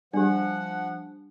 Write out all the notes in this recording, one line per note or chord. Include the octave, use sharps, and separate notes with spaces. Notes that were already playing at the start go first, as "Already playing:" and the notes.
F3 G3 D4 G4 F#5